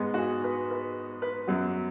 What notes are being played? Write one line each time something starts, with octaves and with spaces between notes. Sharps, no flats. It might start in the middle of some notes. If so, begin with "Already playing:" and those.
Already playing: G#2 G#3 B3
F#4
G#4
B4
B4
B4
F#2 F#3 B3